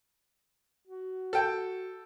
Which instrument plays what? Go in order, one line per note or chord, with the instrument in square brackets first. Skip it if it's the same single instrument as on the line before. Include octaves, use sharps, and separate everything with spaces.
[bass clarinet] F#4
[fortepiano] A4 G5